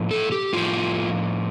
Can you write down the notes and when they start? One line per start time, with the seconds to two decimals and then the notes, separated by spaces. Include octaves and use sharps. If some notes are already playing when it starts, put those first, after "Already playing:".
Already playing: A2 F3
0.11 A4
0.32 G4
0.53 A2 F3 F4